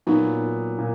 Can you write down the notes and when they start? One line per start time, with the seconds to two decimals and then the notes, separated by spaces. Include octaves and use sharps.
0.07 A#2 F#3 B3 D#4
0.79 A#2